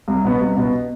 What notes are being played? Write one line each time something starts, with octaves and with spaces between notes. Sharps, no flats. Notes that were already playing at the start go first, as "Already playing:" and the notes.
C2
B2 B3
C2
B2 B3